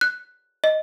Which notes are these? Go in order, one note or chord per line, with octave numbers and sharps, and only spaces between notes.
F#6
D#5